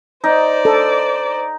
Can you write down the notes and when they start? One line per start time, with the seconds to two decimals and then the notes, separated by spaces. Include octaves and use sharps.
0.24 D#4 C5 D5
0.65 A4